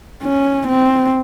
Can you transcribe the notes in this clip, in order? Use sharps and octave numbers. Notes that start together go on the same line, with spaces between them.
C#4
C4